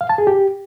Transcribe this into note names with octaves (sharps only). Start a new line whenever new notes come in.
F5
A5
G#4
G4